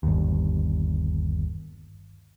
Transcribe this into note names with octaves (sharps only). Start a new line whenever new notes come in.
G1 D#2